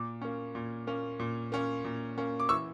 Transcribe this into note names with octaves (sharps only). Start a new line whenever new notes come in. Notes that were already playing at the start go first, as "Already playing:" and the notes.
Already playing: A#2 D6
A#3 C#4
A#2
A#3 C#4
A#2
A#3 C#4
A#2
A#3 C#4
D6
E3 C#6 E6